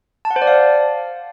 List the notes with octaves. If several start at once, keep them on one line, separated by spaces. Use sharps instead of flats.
A5
F#5
C5
D5
F5